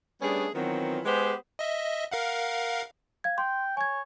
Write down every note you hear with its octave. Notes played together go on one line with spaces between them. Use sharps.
G3 A3 B3 C#4 D4 G#4
D#3 E3 F#3 B3 C4 F4
G#3 B3 G4 G#4 B4 C5
D#5 E5
A#4 F5 F#5
F5 G#6
G5 C6
C#5 G#5 G#6